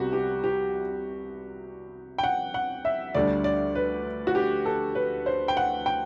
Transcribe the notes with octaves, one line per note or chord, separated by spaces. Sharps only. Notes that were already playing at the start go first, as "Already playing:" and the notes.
Already playing: C2 C3 G3 B3 F#4 G4
G4
G4
G5
F#5
F#5
E5
D2 D3 G3 D4 D5
D5
B4
F#4
G4
A4
B4
C5
G5
F#5
G5